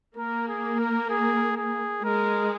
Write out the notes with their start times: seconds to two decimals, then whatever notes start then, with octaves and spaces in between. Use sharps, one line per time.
0.17 A#3 A#4
0.48 G#4
0.79 A#4
1.10 G#4
1.57 G#4
2.04 G#3 A#4